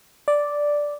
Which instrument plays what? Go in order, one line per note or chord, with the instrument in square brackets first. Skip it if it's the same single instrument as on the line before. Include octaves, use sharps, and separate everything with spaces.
[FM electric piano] D5